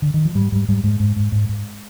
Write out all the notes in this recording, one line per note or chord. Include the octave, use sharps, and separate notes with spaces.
D3
D#3
F3
G#2 G3
G#2 G3
G#2 G3
G#2 G#3
G#2
G#2
G#2
G#2